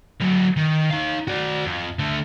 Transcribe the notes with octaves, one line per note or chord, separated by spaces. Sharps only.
D3 F#3
D#3
D#4 F5
F#4 D5
F2
D3 A3